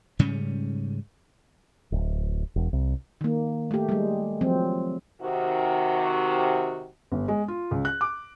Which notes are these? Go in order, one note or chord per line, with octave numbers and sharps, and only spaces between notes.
G#2 C#3 G3 C#4
D1
E1
C2
D#3 A#3
A3 G4
G3 G#3
F3 F#3 C4
C3 D#3 F#4
G1
G#3
F4
C#2
F#6
D6